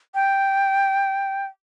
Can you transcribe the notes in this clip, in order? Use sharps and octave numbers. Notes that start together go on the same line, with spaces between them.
G5